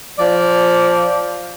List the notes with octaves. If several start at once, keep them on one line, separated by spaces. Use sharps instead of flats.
F3 D5